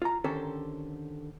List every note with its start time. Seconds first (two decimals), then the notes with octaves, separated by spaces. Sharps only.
0.02 F4 A#5
0.24 D3 D#3 C#4 G4 A4 C5